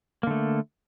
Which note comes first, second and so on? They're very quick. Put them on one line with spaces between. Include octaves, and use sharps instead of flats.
A#3 D3 A3